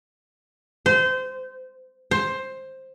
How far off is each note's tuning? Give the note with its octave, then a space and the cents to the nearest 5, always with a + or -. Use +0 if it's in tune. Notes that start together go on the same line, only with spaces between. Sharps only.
C5 -25
C5 +10